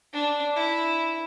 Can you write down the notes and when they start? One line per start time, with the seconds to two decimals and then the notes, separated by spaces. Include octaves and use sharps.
0.13 D4
0.56 E4